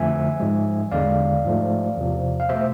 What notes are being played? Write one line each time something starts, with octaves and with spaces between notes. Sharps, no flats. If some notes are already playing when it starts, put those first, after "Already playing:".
Already playing: F2 D3 F3 A3 E5 G#5
G#2 F3 G#3
E2 D3 G#3 D5 F5
G#2 F3 A3
E2 C3 F3
F5
B2 A3 C5 E5